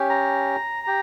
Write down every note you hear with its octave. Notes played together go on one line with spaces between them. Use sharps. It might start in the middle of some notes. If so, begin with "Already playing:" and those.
Already playing: C#4 G4
A#5
G4